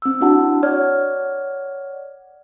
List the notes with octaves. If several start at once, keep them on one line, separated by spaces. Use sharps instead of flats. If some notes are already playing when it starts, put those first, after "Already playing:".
C4 E6
D4 E4 F#4 F#5 A5
C#5 D5 F#5 F6 G#6